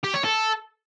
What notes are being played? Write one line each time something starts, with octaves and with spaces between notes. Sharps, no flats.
G4
C#5
A4